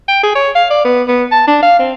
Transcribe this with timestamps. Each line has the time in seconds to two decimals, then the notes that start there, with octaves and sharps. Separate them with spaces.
0.08 G5
0.23 G#4
0.35 C#5
0.55 F5
0.70 D5
0.85 B3
1.08 B3
1.32 A5
1.47 D4
1.63 F5
1.79 C4